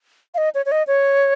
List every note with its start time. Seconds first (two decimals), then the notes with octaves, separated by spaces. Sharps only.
0.34 F5
0.38 D#5
0.55 C#5
0.66 C#5
0.72 D#5
0.87 C#5